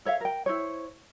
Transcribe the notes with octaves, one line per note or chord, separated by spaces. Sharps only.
A4 C#5 E5 F5
A#4 G5
E4 C5 C#5